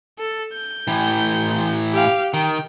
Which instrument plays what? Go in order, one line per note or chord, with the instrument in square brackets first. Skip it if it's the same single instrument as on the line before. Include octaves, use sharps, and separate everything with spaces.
[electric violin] A4
G6
[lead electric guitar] A2 E3
[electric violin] G4 F5
[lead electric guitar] D#3 [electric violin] G5